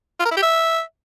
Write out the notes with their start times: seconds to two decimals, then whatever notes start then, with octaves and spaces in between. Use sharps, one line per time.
0.20 F4
0.25 A#4
0.31 E4
0.37 G4
0.43 E5